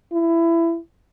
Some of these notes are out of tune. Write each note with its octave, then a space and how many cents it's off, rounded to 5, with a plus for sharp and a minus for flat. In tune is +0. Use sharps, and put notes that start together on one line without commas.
E4 +20